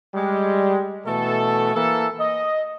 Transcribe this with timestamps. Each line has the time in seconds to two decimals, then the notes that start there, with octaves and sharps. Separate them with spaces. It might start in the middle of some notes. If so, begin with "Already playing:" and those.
0.15 G3 G#3
1.06 B2 E3 A3 A4
1.75 E3 A#3 A4
2.20 D#5